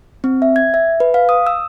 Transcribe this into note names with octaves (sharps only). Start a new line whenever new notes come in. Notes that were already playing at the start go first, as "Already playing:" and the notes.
C4
E5
G#6
E5
B4
F5
D#6
E6